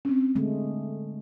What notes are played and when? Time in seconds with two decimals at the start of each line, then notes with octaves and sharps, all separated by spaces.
0.05 C4 C#4
0.36 D3 G#3 A3